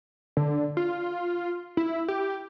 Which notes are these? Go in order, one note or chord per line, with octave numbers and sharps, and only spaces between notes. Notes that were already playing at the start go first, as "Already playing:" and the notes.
D3
F4
E4
G4